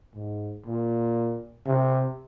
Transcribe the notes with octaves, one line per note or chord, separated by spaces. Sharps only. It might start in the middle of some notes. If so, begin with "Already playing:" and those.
G#2
A#2
C3